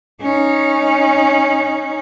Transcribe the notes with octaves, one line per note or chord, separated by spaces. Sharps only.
C#4 D#4